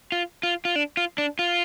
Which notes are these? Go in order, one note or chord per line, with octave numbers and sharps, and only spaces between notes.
F4
F4
F4
D4
F4
D4
F4